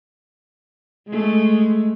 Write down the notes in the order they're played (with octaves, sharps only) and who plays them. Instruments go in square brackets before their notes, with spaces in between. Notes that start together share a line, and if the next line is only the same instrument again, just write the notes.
[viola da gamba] G#3 A3